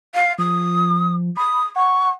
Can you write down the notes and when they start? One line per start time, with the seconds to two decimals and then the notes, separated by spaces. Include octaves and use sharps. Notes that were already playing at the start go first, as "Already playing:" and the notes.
0.14 F5
0.38 F3 D#6
1.37 B5 D#6
1.76 F#5 C#6